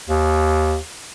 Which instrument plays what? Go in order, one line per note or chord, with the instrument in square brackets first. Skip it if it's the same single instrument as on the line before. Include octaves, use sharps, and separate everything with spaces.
[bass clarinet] D#2